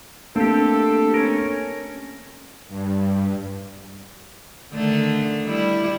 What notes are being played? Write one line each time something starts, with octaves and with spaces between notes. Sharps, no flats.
A3 A#3 C4 D4 G4 A4
C#4 A#4
G2
D3 D#3 A3
G3 E4